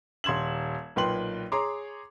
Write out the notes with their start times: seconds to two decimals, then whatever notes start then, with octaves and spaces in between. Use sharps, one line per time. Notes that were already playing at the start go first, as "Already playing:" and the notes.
0.24 D#1 C6 G#6 E7 F#7
0.96 B1 A#2 B4 G5 C6 F#7
1.52 G#4 C#5 A#5 C6 D6